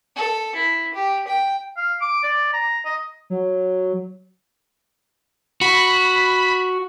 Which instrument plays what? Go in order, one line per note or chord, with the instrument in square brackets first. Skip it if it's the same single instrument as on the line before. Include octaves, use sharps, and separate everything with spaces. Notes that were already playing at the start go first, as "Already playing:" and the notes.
[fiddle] A4
E4
G4
G5
[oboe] F5
D6
D5
A#5
D#5
[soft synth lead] F#3
[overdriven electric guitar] F#4 [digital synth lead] B5